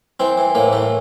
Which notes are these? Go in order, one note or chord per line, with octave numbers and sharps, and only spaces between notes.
E3 C4
E3
A2 A#3
E3 A3